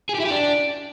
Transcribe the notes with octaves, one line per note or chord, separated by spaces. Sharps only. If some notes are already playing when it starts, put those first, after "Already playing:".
G#4
G4
E4
G4
D4